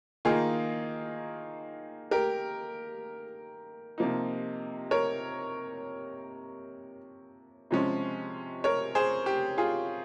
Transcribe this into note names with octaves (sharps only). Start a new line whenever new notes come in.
D#3 A#3 D#4 F4 G#4
G4 A#4
C3 F3 A#3 D#4
A#4 C#5
C3 F3 G#3 C#4
A#4 C#5
G#4 C5
G4
F4 G#4